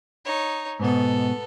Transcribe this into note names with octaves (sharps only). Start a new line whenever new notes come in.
D#4 C#5
G#2 B2 B3 A4